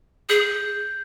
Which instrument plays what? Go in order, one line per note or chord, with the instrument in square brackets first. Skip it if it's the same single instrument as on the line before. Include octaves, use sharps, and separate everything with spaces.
[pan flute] G#4 [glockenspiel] G6